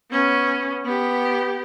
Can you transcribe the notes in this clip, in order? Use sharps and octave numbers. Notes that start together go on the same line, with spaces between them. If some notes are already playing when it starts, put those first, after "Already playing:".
B3 C#4
B3 G4